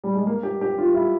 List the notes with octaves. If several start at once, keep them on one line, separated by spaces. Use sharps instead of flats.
G3
G#3
A#3
G4
G4
F4
E4